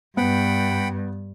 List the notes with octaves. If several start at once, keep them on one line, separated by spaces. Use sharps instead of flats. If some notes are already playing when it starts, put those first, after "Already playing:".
G2 B3 F#5 G5 B5